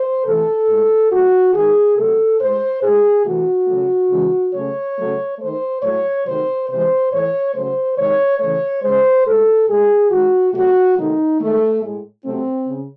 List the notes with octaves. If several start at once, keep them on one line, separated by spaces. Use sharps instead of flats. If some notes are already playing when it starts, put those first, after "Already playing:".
Already playing: C5
C3 E3 A3 A4
A2 G#3
A2 F#3 A3 F#4
D#3 G#3 G#4
C3 F#3 A3 A4
A2 G#3 C5
A2 G#3 G#4
C3 E3 A3 F#4
C#3 F#3 A3
C#3 E3 G#3
C#3 F#3 A3 C#5
C#3 F#3 A3
D#3 A3 C5
A2 F#3 A3 C#5
C3 D#3 F#3 A3 C5
C3 E3 G#3 C5
A2 E3 A3 C#5
C#3 F#3 A3 C5
C3 D#3 G#3 C#5
C#3 E3 A3 C#5
C#3 G#3 C5
A2 G#3 A4
A2 G#3 G#4
D#3 G#3 F#4
C3 F#3 A3 F#4
C3 D#3 F#3 A3 D#4
D#3 G#3 A3
A2 G#3
C3 F#3 A3 C4
C#3